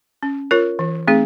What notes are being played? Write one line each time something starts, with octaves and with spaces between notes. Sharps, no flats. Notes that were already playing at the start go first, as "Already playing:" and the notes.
C#4
F4 A#4 C#5
E3
A3 C4 D#4 G#4